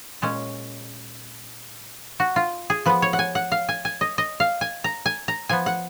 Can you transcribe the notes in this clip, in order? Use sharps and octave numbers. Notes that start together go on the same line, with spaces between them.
A#2 G#3 C#4
F#4
F4
G#4
F3 B3 B4
C#5
F#5
G#5
F#5
F5
G#5
G#5
D#5
D#5
F5
G#5
A#5
G#5
A#5
F3 B3 G#5
F#5